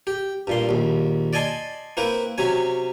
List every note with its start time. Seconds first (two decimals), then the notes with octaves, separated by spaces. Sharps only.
0.07 G4
0.47 G2 A#2 C6
0.69 A#1 D#2
1.33 D5 D#5 G#5 A5 C6
1.97 A#3 C4 E4 B4
2.38 C3 F#3 C#4 G#5